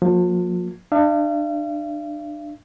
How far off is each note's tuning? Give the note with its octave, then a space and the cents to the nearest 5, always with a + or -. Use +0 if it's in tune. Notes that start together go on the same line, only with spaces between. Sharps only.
F3 +40 A#3 +0
D4 +30 F5 -40